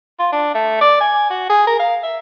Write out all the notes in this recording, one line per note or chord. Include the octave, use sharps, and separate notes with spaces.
F4
D4
A3
D5
G#5
F#4
G#4
A#4
F5
E5